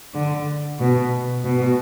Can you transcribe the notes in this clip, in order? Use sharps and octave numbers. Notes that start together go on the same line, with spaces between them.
D3
B2
B2